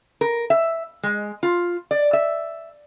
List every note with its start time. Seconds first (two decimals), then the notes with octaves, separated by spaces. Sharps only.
0.21 A#4
0.50 E5
1.03 G#3
1.43 F4
1.91 D5
2.13 E5